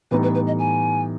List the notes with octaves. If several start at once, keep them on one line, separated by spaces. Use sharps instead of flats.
A2 E3 G3 B3 D#4 B4
B4
B4
D#5
G#5